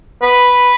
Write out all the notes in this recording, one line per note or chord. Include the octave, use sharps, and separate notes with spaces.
B4